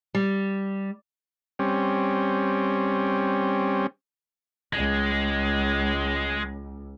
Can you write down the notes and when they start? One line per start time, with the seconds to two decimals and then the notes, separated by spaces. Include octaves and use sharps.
0.15 G3
1.59 G3 C4 C#4
4.73 C#2 G#3